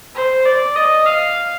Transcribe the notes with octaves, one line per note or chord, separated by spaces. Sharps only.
C5
D5
D#5
F5